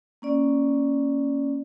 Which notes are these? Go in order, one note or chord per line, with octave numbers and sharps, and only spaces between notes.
A#3 C#4 D5